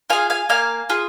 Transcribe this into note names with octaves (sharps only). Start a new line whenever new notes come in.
F4 G#4 F5 G#5
F5 G#5
A#3 F5 G#5
F4 G#4